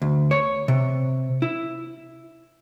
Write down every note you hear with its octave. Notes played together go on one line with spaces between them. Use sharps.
D2
C#5
C3
E4